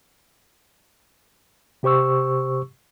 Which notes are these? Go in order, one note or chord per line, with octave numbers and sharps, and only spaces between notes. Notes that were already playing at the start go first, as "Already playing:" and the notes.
C3 G4 C5 C#6 E6